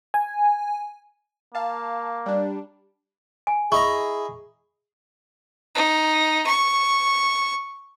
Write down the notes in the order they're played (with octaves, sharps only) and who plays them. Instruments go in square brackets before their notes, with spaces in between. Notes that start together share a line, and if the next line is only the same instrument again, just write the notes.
[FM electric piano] G#5
[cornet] A#3 [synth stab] F5 A5
[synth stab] G3 D4
[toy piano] G#5
[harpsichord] E4 D#5 A#5 [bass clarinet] G#4 [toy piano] C#6
[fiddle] D#4
C#6